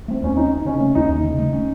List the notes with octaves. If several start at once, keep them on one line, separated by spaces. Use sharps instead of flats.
A3 C4
D#2 C#4
C4 D#4
C4
C#3 C#4
A3
D#2 D#4
D#2
C#3
A3
C#4